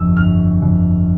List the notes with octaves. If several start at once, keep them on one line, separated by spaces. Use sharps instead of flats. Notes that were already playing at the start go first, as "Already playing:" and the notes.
Already playing: G1 F2 E6
G1 F6
F2